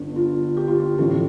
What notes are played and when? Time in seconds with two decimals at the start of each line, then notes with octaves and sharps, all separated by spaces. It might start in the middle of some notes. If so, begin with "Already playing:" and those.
Already playing: G1 G2 D3
0.16 F4
0.57 G4
0.68 F4
0.80 G4
0.98 A1 A2 F3 A3 A4